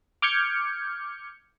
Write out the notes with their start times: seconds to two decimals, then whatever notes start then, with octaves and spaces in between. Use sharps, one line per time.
0.22 D6 F6 G6 G#6 C#7